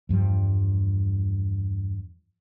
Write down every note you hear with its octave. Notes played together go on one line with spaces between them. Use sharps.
E2 G2 F3 G3